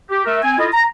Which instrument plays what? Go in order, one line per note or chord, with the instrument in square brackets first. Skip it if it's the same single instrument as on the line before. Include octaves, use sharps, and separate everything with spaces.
[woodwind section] G4
A3 A#4 E5
C4 G#5
E4 F4 A4 D#5
A#5